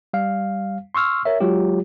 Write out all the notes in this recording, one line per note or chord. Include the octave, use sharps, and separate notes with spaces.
G3 F5
C6 C#6 E6 F6
A#4 C#5 E5
F#3 G#3 F4 G4